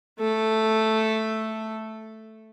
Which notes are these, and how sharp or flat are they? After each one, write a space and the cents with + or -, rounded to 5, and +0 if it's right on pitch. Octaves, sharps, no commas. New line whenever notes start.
A3 +0 A4 +0